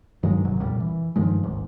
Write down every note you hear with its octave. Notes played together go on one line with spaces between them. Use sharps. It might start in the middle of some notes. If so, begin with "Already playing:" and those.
G2 D#3 F#3 G#3
F#1 G#2 C3 F#3
C2 F2 A#2 G3
E3
G2 D#3 F3 G#3
D1 G#1 G#2